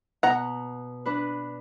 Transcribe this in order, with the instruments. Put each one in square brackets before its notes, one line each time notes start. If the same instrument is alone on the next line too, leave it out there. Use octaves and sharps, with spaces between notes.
[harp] B2 [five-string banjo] F#5 A#5
[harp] D4 B4